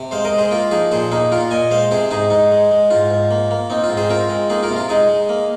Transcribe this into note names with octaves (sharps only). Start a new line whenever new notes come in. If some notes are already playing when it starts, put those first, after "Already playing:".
Already playing: C3
G#3 C5 F5
A#4 D#5
G#3
G#4 C5
A#3 F4 A#4
F3 D#4 G#4
A#2 G#4 C5
A#3 D#4 G#4
A#2 F4 A#4
A#2 D#5 G#5
G#3 C5 F5
C3 G#4 C5
G#2 D#4 G#4
G#2 D#4
G#3
G#3
G#2 F4
G#2
A#3
A#3
C4 D#4
F4
G#2
G#4 C5
C4 F4 A#4
G#3
A#3 D#4 G#4
F4 A#4
C3
F4
G#3 D#4 G#4
G#3
A#3